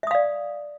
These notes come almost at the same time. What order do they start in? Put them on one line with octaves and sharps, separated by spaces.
E5 D#6 F5 D5